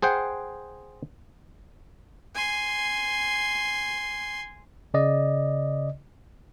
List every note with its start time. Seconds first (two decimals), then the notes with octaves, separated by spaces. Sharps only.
0.02 G#4 C5 F#5 G5
2.35 G#5 C6
4.94 C#3 D5 D#5